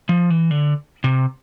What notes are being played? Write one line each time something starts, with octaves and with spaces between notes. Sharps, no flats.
F3
E3
D3
C3